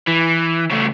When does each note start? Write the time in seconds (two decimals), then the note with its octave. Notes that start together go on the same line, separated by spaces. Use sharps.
0.07 E3
0.70 C#3 A3